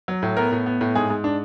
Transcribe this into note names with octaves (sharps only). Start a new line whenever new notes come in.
F#3
A2
B3 A#4
A2
B3
A2
G#2 G#4
G#2
D4